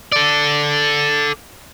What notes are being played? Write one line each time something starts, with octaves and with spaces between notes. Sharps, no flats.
A4 D5